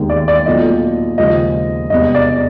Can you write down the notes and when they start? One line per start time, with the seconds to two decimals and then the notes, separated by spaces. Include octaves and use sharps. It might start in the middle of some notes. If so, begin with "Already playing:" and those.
Already playing: E1 D#2 D#3 G#3
0.10 D5
0.28 D5
0.46 B1 A#2 F#3 A3 D#5
1.18 D#2 C#3 F3 G#3 D#5
1.90 E1 E2 C3 E3 G3 D#5
2.15 D5